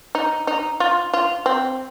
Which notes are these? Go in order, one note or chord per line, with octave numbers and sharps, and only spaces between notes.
D#4
D#4
F4
F4
C4